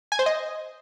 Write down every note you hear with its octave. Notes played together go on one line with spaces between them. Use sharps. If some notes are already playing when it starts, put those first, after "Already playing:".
G#5
C5
D#5